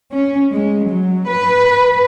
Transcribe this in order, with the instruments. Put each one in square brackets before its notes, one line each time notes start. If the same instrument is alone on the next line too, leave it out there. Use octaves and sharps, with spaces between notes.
[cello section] C#4
G#3
F#3
B4